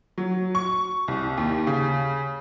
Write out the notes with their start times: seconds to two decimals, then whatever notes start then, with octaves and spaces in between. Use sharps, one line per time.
0.18 F#3
0.55 C#6
1.08 C2
1.38 D#2
1.67 C#3